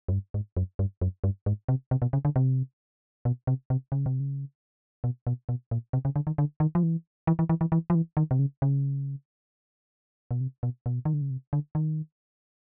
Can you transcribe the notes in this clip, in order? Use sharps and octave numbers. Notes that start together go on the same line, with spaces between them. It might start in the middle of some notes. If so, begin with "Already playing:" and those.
F#2
G2
G#2
F#2
G2
F#2
G2
G#2
C3
C3
B2
C#3
D3
C3
B2
C3
C3
C#3
C3
C#3
B2
B2
B2
A#2
C3
C#3
D3
D#3
D3
D#3
F3
E3
E3
E3
E3
E3
E3
F3
E3
D#3
C3
C#3
C#3
B2
C3
B2
B2
D#3
D3
C#3
C3
D3
D#3